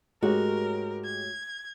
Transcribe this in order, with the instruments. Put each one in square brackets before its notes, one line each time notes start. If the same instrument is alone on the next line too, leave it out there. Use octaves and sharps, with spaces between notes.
[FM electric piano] G#2 A3 C#5 [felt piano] G#3 G4 [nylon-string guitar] F#4 [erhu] A#4
[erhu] G#6